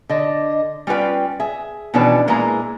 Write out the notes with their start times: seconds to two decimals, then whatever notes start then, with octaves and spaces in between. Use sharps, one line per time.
0.09 D3 D#5
0.87 G3 C#4 F4 B4 G5
1.40 G#4 E5
1.94 B2 D#3 E3 C#4 D4 B4
2.27 A#2 G#3 A#3 E4 B4 A#5